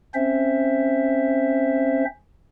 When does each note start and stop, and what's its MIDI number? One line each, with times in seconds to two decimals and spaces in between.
0.14 2.05 60
0.14 2.05 61
0.14 2.05 72
0.14 2.05 76